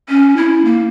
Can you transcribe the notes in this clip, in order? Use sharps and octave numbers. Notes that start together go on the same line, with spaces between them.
C#4
E4
A#3